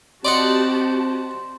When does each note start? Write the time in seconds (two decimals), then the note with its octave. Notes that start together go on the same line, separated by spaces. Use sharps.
0.25 C4 F#4 G4 D5 D#5 F#5 A5 C6